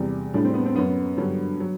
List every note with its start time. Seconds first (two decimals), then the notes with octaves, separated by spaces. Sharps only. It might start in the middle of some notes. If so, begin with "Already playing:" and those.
Already playing: E2 C3 G3
0.34 A2 G3 D4
0.45 C4
0.54 B3
0.66 C4
0.75 F#2 F#3 B3
1.17 G2 D3 F#3
1.60 F#3